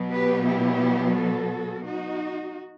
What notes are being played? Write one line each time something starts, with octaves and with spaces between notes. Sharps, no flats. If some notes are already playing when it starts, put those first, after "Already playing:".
Already playing: B2 F#3 B3
G4 B4
E4 G4
F#4 A4
D#4 F#4